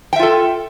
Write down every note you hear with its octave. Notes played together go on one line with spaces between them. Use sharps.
F4 A4 E5 G5